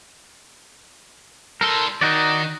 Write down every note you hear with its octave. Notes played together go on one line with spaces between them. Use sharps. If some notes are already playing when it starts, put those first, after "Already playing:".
G3 A4 A#4 C6
D#3 D#4 F#4 D5